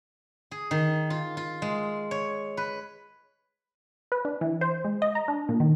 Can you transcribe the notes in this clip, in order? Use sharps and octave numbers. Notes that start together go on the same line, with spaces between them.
G#4
D#3
F4
F4
G#3
C#5
B4
B4
D4
E3
C5
G#3
D#5
A#5
D4
A#2
D#3